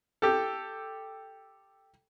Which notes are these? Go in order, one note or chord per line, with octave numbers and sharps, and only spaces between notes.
G4 A4